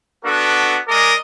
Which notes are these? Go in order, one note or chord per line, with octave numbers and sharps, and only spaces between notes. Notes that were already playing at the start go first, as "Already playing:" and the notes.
B3 D4 F#4 A4
G#3 A#4 D5 D#5